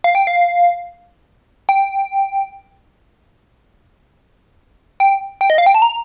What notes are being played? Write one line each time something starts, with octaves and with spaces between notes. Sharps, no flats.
F5
G5
F5
G5
G5
G5
D#5
F5
G5
A5
A#5